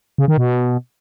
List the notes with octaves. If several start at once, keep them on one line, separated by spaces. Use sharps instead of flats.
C#3
D#3
B2